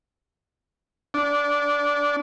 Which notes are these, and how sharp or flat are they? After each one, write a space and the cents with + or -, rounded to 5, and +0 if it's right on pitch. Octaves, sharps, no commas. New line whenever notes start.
D4 -20